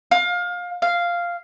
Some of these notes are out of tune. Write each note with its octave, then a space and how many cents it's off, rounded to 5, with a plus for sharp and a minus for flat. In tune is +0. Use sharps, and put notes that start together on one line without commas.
F5 +25
F5 -5